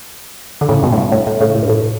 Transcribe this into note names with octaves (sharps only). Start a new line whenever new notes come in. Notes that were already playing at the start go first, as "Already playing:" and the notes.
D3
A2 C#3
G2 B2
A2
G2
A2
A2
A2 C#3
A2
G2
A2